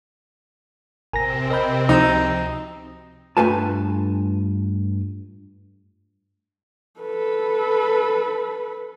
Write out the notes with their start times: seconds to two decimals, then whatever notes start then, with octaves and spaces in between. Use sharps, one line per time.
1.13 A1 C3 C4 A#4 G#5 A#6
1.50 A#4 D#5 B5 G6
1.89 C#2 F3 D#4 F#4 E6
3.37 G2 A3 F4 B4 G#5 A5
7.00 A4 B4